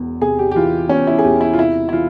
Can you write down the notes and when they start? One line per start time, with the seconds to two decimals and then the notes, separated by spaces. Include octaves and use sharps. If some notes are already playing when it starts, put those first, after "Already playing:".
Already playing: E1 E2
0.21 C3 G#4
0.39 G4
0.51 G4
0.56 E3 F4
0.89 E2 C#4
1.07 E4
1.19 G#4
1.24 E1 G4
1.41 E4
1.53 F4
1.58 C3 E4
1.89 E4
1.92 E3 F4